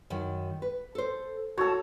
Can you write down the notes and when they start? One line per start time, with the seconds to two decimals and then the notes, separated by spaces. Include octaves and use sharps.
0.10 F#2 D#3
0.62 B4
0.95 A4 C5
1.58 F#4 A4 C#5